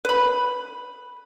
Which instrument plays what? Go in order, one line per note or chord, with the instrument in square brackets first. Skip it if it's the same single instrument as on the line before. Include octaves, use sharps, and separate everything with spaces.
[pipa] B4 B5